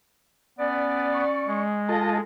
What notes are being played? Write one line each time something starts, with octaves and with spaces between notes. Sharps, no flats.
B3 C#4 D5
C#6
G#3
F4 A4 D#5 A5